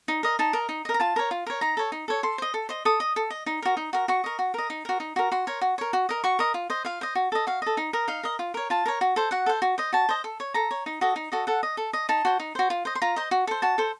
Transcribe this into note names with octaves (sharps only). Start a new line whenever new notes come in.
D#4
A#4 D#5
D#4 A5
A#4 D#5
D#4
D#5
A#4
A#5
F4 A5
A#4 C#5
F4
A#4 C#5
D#4 A#5
A4 C#5
D#4
A4 C#5
A4 C6
C5 D#5
A4
C5 D#5
A4 D#6
D#5
A4
D#5
D#4
F#4 A#4
D#4
F#4 A#4
F#4 C#6
A#4 D#5
F#4
A#4 D#5
D#4
F#4 A#4
D#4
F#4 A#4
F#4 C6
A#4 C#5
F#4
A#4 C#5
F#4
A#4 D#5
F#4 C#6
A#4 D#5
F4
C5 D#5
F4 F5
C5 D#5
F#4
A4 D#5
F#4 F5
A4 D#5
D#4
A#4 D#5
D#4 F5
A#4 D#5
F4
A#4 C#5
F4 A5
A#4 C#5
F#4
A4 C5
F#4 F#5
A4 C5
F#4
C5 D#5
F#4 A5
C5 D#5
A4
C#5
A4 A#5
C#5
D#4
F#4 A4 D#5
D#4
F#4 A4 D#5
A4 F#5
D#5
A4
D#5
D#4 A5
F#4 C5
D#4
F#4 C5
F4
C5 D#5
C6
F4 A#5
C5 D#5
F#4
A4 C5
F#4 A5
A4 C5